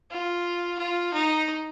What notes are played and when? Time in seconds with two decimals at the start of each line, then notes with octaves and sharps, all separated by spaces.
0.11 F4
0.79 F4
1.13 D#4